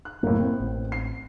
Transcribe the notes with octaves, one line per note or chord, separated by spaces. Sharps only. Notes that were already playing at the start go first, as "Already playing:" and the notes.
F#6
F#1 A2 A#3
C4
A1
C7